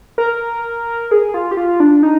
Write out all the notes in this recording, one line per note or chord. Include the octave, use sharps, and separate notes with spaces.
A#4
G#4
F4
G4
F4
D4
D#4